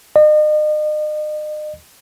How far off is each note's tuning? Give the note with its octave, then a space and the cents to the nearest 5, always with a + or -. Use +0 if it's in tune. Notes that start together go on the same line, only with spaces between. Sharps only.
D#5 -40